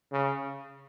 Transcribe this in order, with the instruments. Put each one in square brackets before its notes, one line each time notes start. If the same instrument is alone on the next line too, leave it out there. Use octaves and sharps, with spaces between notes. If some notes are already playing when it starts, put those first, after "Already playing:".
[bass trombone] C#3